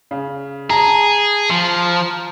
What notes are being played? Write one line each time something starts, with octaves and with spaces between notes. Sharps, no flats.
C#3
G#4 A5 A#5
F3